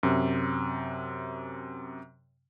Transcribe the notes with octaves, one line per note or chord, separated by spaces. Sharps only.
F#2 C3